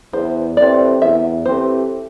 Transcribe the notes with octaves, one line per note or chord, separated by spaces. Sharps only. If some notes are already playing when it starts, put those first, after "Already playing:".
E2 C5
E3 A3 C4 G4 D5
E2 E5
E3 A3 C4 G4 C5